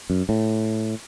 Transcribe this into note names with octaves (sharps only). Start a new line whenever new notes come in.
F#2
A2